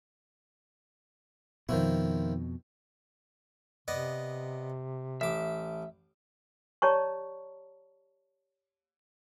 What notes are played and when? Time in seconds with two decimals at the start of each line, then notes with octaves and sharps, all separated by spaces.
1.69 F2 B2 D#3 F3 E4
3.88 C3 B3 D5 D#5
5.21 A1 E5 D6
6.82 G4 C#5 D5 A5 A#5 C#6